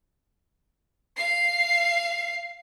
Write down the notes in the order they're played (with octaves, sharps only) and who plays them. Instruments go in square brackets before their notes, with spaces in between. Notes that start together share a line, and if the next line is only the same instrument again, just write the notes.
[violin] F5 C7